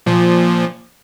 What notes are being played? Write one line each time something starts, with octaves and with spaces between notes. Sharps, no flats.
A#2 F3